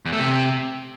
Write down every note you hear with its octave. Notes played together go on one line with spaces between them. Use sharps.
E2
A3
C3